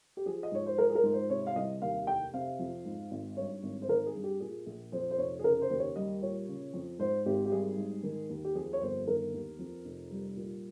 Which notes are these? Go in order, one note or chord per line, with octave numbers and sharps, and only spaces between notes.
G4
F3 G#4
D#5
G#2 C#5
C5
F3 A#4
G#4
A#4
G#2
C5
C3 C#5
F5
C2 D#5
D#2 F5
F1 G5
C3 F5
F2
G#2
G#1
G2 C#5
G#1
C5
D#3 A#4
G#4
G2
G4
A#2 G#4
A#1
F2 C5
C5
F1 C#5
G#4
C#3 A#4
C5
D#2
C#5
G3 D#5
A#2 C#5
C#3
F2
G#2 C5
G#1 G4
G4
G3 G#4
G#2
D#3
D#2
G4
F2 G#4
C#5
G1 C5
D#3 A#4
D#2
F2
F1
G3
A#2